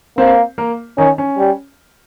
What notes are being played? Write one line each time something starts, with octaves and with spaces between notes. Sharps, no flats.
A#3 C4 C5
A#3 A#4
D#3 C#4 D#4
C#4
G3